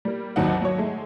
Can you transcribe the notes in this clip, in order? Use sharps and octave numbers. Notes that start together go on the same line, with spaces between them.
G3 A#3
G#1 D#2 F#3 D4 D#4 F#5
F#3 C#5
G#3 A3